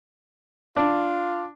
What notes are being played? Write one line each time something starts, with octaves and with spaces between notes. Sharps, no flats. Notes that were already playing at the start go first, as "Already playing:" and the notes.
D4 F4